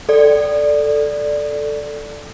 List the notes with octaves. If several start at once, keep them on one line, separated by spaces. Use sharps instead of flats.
A4 D5